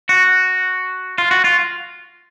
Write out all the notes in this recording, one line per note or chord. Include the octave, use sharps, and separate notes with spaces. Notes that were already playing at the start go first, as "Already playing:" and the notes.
F#4
F4
F#4
F4